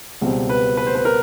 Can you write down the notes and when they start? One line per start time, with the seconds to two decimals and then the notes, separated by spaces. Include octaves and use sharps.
0.21 C#2 B2 G3 C4
0.49 B4
0.77 B4
0.86 C5
0.95 B4
1.05 A#4